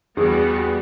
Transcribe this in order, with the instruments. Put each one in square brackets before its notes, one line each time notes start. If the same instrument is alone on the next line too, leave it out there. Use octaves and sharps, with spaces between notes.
[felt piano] E2 G#4 [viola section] G3 B3 F#4